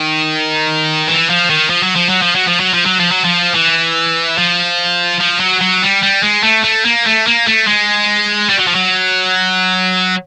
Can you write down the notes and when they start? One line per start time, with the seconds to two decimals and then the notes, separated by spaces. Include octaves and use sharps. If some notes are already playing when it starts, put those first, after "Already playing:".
Already playing: D#3
1.08 E3
1.30 F3
1.50 D#3
1.70 F3
1.83 F#3
1.96 F3
2.09 F#3
2.22 F3
2.35 F#3
2.47 F3
2.60 F#3
2.74 F3
2.86 F#3
3.00 F3
3.11 F#3
3.25 F3
3.55 E3
4.38 F3
5.21 F3
5.40 F#3
5.61 F#3
5.82 G3
6.03 G3
6.23 G#3
6.43 A3
6.64 A3
6.85 A#3
7.06 A3
7.26 A#3
7.47 A3
7.67 G#3
8.49 G3
8.58 F#3
8.68 F3
8.75 F#3